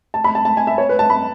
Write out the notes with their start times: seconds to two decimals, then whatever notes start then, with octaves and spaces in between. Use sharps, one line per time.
0.14 A5
0.24 B5
0.35 A5
0.45 A5
0.57 G#5
0.67 E5
0.78 C#5
0.89 B4
0.99 A5
1.10 B5